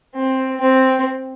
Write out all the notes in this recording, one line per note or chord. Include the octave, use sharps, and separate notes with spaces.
C4
C4